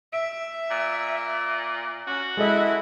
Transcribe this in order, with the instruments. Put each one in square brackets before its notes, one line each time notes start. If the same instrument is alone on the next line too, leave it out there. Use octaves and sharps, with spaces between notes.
[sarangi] E5 [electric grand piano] D7
[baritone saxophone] A#2
[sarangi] C#4 [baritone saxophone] F#4
[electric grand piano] G#3 A4 D#5 [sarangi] E4